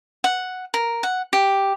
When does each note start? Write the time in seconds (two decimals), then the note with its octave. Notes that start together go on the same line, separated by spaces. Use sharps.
0.24 F#5
0.74 A#4
1.03 F#5
1.33 G4